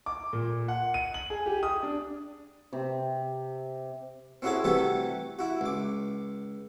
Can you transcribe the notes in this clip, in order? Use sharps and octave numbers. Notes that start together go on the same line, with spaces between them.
D6
A#2
F#5
D#7
F#7
G#4
G4
D#6
D4
C3
C4 C#4 E4 F#4 G#4 A4
C3 E3 G3 A3 F#4 F#5
E4 F#4
C#2 D6